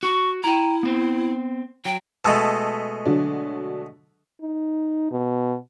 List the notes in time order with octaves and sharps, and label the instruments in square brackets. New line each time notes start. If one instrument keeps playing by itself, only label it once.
[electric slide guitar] F#4 [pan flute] C#6
[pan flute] E4 [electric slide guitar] G5 A#5
[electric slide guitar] B3 C4
[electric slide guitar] F#3 [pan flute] G5
[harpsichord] B2 G#3 A3 [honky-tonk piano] A5 E6
[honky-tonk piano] D3 F#3 D4
[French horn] D#4
B2